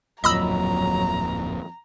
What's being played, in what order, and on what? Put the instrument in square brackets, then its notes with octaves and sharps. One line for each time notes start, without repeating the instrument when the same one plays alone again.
[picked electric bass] D1 F2 A#2 [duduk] F#3 [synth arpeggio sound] D#5 B5 E6 [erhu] A#5